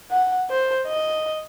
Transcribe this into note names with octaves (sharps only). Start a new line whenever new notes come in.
F#5
C5
D#5